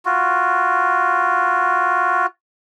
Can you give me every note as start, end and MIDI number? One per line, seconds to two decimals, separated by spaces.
0.06 2.26 65
0.06 2.26 66